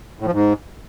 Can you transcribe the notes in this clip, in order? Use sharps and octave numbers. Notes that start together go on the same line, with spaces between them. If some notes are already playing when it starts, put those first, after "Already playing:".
A2
F3
G#2